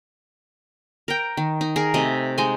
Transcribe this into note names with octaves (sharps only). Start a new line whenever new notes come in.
A#4 G5
D#3
D#4
G#4 A#4
C3 A3 D#5
G#3 D#4 D#5 G#5